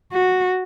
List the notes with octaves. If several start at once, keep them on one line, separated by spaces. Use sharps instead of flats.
F#4